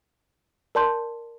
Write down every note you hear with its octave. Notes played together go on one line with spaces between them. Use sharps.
A#4 D5 A5 C6 G6